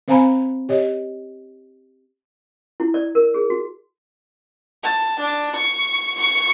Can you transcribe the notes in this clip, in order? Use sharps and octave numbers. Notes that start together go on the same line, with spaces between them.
C4 C5 F5 G#5 A#5 B5
G4 C#5 D#5
E4
D5
A#4
G#4
F#4
A5
D4
C#6
C#6